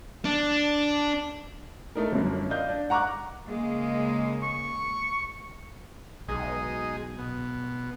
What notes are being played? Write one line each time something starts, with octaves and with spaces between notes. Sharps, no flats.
D4
A3 D#4 A#4
G1 F#2
D5 D#5 F5 G6
D4
F#5 A#5 C#6 D6 F#6
C#3 G#3 A#3
C#6
B1 G#3 D#4 G#4
B2